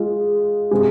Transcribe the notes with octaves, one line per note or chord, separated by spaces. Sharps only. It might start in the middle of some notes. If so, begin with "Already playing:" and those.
Already playing: G#3 F4
C3 G#3